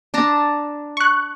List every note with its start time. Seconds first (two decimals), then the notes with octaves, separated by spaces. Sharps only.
0.14 D4 A5 A#5
0.97 C#6 F#6